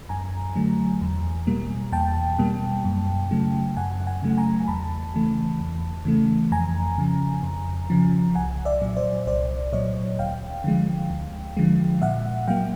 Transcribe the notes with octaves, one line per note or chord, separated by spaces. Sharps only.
F#2 G#5 A#5
D3 F#3 A3
E2
B2 G3 A#3
E2 G5 A5
B2 G3 A#3
F#2
C#3 F#3 A3
F#2 F#5 G#5
F#5 G#5
C#3 F#3 A3
G#5 A#5
E2 A5 B5
C#3 E3 A3
E2
C#3 E3 A3
F2 G#5 A#5
C#3 F3
F2
C#3 F3
C2 F#5 G#5
D5 E5
A#2 F#3
C5 D5
C2 C5 D5
A#2 F#3 C#5 D#5
D2 F5 G5
D3 F3 G#3
D2
D3 F3 G#3
A#2 E5 F#5
F#3 A#3 F5 G5